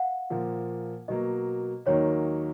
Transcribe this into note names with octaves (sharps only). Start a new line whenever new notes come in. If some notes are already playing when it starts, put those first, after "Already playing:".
Already playing: F5 F#5
A#2 F3 A#3
B2 F#3 A#3 D#5
D#2 D#3 F#3 A#3 D#4 C#5